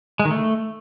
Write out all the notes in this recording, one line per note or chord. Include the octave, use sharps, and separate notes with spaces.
G#3
D#3
A3